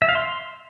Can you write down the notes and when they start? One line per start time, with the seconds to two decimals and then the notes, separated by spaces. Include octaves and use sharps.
0.02 E5
0.09 F5
0.15 C6